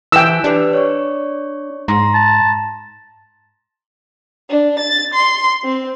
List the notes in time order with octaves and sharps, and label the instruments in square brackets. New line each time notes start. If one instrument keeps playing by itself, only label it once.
[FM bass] E3 [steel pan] G5 E6 [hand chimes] G#5 F#6 B6
[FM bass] D4 [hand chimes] G4 B4 D5
[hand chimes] C#5 D5 C#6
[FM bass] G#2 [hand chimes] A#5 C6 A#6
[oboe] A5
[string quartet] D4
A6
C6
C4